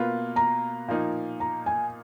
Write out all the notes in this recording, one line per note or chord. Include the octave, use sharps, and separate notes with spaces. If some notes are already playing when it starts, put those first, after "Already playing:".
Already playing: B2 A#3 F4 B4
A#5
A#2 F3 A#3 D#4
A#5
G#5